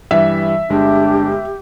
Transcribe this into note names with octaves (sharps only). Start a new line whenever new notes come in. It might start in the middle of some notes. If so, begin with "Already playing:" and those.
G2 E3 G3 E5
G1 G#3 D4 G4